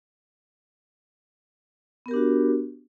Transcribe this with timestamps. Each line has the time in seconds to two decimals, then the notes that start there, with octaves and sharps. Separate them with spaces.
2.06 B3
2.08 A#4
2.11 G4
2.14 D4
2.16 F#4